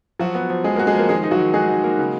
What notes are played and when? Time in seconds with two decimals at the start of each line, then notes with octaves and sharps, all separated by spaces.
0.19 F3 F#3 F#4
0.35 B3
0.50 F3
0.64 F3 G#3 G#4
0.75 A#3 A#4
0.79 F#4
0.87 G#3 G#4
0.94 F3 A#3 A#4
1.09 D#3 G#3 G#4
1.24 D#4
1.31 F#3 F#4
1.39 D#3
1.54 G#3 F#4 G#4
1.69 D#4
1.84 A#3
1.99 C#3